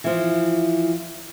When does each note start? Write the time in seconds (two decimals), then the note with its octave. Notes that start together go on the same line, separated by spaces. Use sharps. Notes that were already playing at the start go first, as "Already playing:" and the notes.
0.04 E3 F3